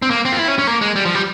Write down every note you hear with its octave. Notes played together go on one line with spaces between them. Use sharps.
C4
A#3
C4
F4
E4
C#4
C#4
A#3
G#3
G3
F3
G3